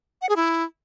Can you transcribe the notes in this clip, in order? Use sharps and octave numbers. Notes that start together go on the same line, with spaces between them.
F#5
G#4
E4